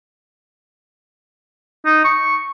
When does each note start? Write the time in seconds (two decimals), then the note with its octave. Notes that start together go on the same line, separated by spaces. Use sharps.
1.86 D#4
2.04 C#6